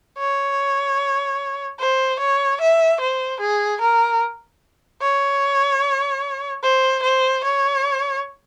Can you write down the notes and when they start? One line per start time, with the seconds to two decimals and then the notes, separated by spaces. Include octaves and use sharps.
0.18 C#5
1.79 C5
2.19 C#5
2.61 E5
3.00 C5
3.40 G#4
3.81 A#4
5.02 C#5
6.63 C5
7.03 C5
7.44 C#5